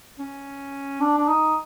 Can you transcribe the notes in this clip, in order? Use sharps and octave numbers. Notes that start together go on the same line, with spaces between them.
C#4
D4
D4
D#4